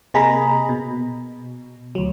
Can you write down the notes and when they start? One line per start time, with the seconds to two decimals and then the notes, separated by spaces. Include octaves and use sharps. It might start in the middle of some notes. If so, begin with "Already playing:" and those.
0.14 C3 A#3 G#4 D#5 A#5 B5
0.69 B2
1.95 D2 F#3